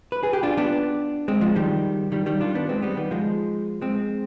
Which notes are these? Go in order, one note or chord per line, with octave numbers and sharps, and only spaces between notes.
B4
G#4
G4
D4 F4
B3 D4
G#3 C4
F3 G#3
D#3 G3
D#3 G3
D#3 G3
D4 F4
B3 D4
G#3 C4
G3 B3
D#3 G3
F3 G#3
G#3 C4